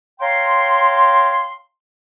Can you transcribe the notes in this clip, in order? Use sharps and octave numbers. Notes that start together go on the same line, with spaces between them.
C#5 F5 G5 A#5 C6